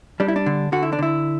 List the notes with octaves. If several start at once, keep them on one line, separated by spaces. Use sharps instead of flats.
G3 D4
E4
D4
D3
D3 F#4
E4
D4
D3 E4